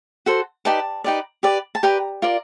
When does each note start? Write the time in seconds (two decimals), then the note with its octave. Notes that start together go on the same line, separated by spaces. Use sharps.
0.26 F#4 A4 C5
0.65 D#4 G4 B4 D5 A5
1.04 D#4 G4 B4 D5
1.43 G4 B4 D5
1.75 A5
1.83 G4 B4 D5 A#5
2.22 F4 A#4 D5